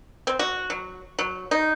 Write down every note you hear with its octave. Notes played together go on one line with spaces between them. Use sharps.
C4
F#4
F#3
F#3
D#4